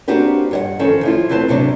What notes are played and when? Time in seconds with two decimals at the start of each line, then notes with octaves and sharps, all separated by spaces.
0.08 A#3 C4 D4 F#4 G4 B4
0.51 G2 C#5 F#5
0.79 D#3 F3 C#4 A4
1.03 F3 E4 F4
1.29 D2 C4 B4 C5 A5
1.48 D#2 C3 F#3 B3 D4